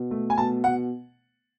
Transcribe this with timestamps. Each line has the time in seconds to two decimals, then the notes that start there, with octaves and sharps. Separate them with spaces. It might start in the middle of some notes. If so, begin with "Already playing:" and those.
Already playing: B2
0.11 A3
0.30 G#5
0.38 B2 A5
0.64 B2 F#5